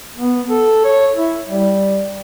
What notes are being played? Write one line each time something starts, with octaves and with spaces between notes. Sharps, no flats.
B3
A4
C#5
E4
G3